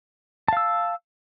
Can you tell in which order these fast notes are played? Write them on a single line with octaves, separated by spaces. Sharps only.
A5 F5 E6